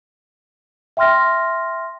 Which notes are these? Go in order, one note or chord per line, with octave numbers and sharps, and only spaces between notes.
E5 G5 C6 F6 A#6